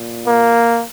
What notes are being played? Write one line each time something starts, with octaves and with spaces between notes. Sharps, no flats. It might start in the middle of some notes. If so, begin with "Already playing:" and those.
Already playing: A#2
A#3